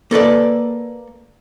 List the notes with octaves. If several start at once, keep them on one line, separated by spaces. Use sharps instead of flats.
A#3 A4 B4 D5